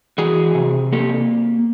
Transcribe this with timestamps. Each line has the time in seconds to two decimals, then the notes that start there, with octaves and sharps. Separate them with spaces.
0.18 E3 F#4 G#4
0.55 C3
0.92 A#3 G4 A4